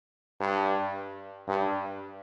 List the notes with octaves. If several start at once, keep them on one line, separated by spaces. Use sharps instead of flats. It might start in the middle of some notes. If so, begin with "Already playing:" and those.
G2
G2